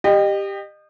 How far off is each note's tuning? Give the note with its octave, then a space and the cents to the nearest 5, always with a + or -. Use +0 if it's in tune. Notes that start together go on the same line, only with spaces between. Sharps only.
G4 +10 D#5 -30